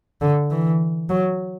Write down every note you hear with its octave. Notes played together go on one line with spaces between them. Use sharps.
D3
E3
F#3